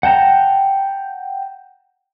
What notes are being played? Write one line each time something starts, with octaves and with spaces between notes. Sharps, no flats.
F#5 G5 A5 A#5